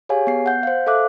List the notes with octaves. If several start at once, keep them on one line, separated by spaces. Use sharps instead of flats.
G4 G#4 C#5 F5 G#5
B3 C7
F#5 G6
C5 F5
A4 E5 F5 D6 F#6